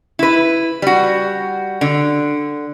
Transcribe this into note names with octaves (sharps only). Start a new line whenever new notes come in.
E4 B4
G3 F#4
D3